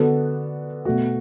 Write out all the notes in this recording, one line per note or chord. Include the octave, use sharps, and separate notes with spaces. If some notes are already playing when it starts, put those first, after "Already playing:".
Already playing: D3 B3 D4 F#4 A4
B2 A3 F#4